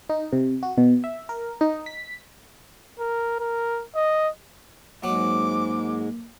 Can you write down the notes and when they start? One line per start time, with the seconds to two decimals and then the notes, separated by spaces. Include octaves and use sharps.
0.09 D#4
0.33 C3
0.63 F#4
0.78 B2
1.04 E5
1.29 A#4
1.61 D#4
1.86 B6
2.99 A#4
3.40 A#4
3.95 D#5
5.04 G#2 F#3 G#3 A#3 D6